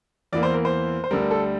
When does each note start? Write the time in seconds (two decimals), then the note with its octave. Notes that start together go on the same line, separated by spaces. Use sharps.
0.33 E2 E3 A#3 D5
0.43 C5
0.54 A#4
0.65 C5
1.04 C5
1.11 D2 D3 G3 A#4
1.31 A4